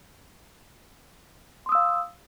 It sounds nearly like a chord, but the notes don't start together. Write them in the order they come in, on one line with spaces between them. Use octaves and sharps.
C6 D#6 E6 F5